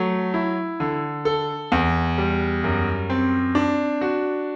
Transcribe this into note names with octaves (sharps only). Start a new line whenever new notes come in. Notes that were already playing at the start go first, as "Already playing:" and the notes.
Already playing: F#3 A3
E4
D3
A4
E2
G3
F#2
C4
D4
F#4